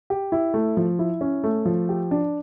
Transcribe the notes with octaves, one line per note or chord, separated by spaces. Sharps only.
G4
E4
A3
F3
E4
C#4
A3
F3
G4
D4